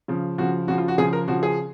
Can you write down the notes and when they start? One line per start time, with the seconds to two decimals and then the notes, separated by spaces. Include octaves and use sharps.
0.08 C#3 F3
0.38 C#3 F3 F#4
0.67 C#3 F3 F#4
0.78 F4
0.88 F#4
0.98 C#3 F3 G#4
1.13 A#4
1.28 C#3 F3 F#4
1.43 G#4